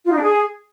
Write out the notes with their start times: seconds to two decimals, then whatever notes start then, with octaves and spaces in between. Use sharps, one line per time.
0.05 F4
0.11 D#4
0.17 D4
0.22 G#4